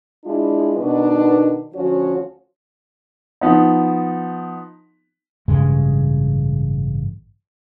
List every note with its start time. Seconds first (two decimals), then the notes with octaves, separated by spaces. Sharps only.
0.25 G#3 D4 E4 F4
0.77 B2 D#3 B3 D4 D#4 B4
1.75 D2 F3 C#4 F#4 C#5
3.41 F3 B3 D#4
5.48 A1 G2 C#3 G#3